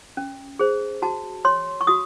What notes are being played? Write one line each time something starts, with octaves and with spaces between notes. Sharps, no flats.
C#4
G#4 C5
F#4 A5
C#5 C6
C#6
F#4 D#6